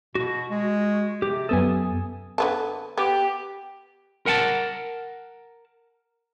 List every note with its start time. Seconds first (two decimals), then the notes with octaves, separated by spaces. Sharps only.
0.15 B2 F#4
0.50 G#3
1.22 C3 G4
1.49 F#2 B3 A4 G#5 D#6
2.38 D3 B3 A5
2.98 B3 G4
4.26 A#4 F#5 G5 A5